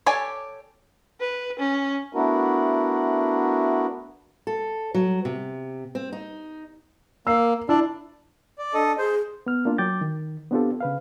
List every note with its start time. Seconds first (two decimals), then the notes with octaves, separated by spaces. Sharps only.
0.06 G4 A4 C#5 D5 G#5
1.20 B4
1.59 C#4
2.13 A3 B3 D4 E4 F#4 A#4
4.47 A4
4.94 F#3
5.25 C3
5.95 C4
6.13 D#4
7.27 A#3 E6 C7
7.69 D4 E4 E6
8.58 D5
8.74 D4 A4 D#5
8.98 G#4 C5
9.46 B3 F6
9.65 A#3 D4 F4
9.78 F#3 G5 D6 G6 A6
10.01 D#3
10.51 B3 C4 D4 F4 G4 A4
10.80 C#3 B4 F5